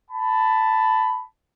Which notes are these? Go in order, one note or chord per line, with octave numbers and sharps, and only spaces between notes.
A5 B5